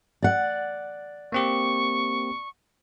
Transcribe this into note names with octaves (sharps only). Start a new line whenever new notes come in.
D5 F#5
A#3 C4 G4 C#6